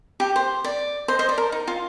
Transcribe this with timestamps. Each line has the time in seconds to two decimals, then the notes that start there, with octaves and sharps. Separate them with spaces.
0.20 G4
0.36 C5
0.64 D5
1.08 C5 D#5
1.19 C5 D#5
1.29 D5
1.38 A#4
1.52 D#4
1.67 F4